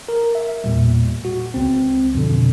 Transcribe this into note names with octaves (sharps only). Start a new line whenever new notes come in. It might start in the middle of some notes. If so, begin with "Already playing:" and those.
A#4
E5
E2 A#2 G3
F#4
C#2 C4
F2 B2 D3